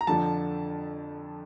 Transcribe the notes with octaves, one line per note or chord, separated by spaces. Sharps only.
A#5
F2 D3 F3 A5